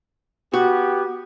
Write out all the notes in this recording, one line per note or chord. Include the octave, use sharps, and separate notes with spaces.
B3 F#4 G4